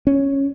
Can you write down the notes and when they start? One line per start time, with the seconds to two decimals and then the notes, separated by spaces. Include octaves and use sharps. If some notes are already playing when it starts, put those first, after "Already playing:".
0.07 C#4